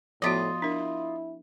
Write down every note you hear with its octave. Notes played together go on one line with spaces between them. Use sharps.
A2 F3 B3 F4 F#4 D#5
D4 E4 A#4